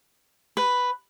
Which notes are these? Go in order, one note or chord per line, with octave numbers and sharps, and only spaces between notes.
B4